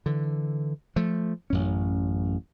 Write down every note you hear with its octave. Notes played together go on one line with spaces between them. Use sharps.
D3 E3
F3 A3
A1 F#2 C#4